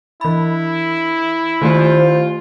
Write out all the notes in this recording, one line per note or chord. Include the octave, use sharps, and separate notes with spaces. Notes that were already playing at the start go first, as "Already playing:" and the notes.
E3 E4 B5
D#3 A3 F4 G4 C5